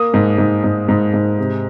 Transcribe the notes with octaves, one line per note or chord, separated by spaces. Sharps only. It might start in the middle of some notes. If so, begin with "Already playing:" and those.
Already playing: A#3 D#6
G#2
G#2
G#2
G#2
G#2
C3